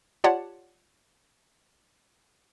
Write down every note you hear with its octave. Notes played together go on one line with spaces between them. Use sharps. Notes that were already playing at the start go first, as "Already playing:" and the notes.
F4 G4 C#5 D5 F#5 A5